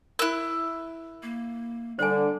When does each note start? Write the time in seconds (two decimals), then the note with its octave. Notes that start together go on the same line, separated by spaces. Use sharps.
0.19 E4 A#4 F#6
1.23 A#3
1.99 D3 G3 C5 G#5